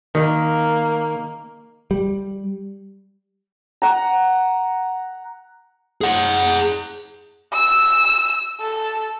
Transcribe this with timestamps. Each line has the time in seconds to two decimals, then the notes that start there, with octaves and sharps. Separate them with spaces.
0.15 D#3 A#3
1.91 G3
3.82 F#5 A#5
6.01 G#4 F#5
7.53 E6
8.61 A4